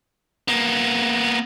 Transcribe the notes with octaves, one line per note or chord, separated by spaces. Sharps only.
A#3 B3